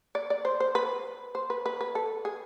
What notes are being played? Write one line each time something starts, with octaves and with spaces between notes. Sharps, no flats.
D5
D5
C5
C5
B4
C5
B4
B4
B4
A4
G#4